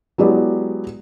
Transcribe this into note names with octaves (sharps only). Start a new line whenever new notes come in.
F#3 G#3 B3 E4 G4 D5